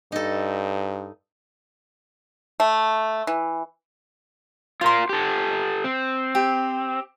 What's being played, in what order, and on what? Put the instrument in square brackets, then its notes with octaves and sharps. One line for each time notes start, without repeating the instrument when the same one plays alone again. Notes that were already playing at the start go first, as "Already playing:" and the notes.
[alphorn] G2 [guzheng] D#4 A4
[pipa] A3
E3
[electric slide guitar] F4 A#4 [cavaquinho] C5 C6
[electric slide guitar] G4 A4
C4
[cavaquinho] G4